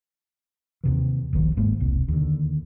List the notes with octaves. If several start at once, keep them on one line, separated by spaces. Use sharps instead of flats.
D#2 C3 E3
D#1 A#1 D#3 F3
G1 G#2 G#3 A#3
E1 C2
D#2 D3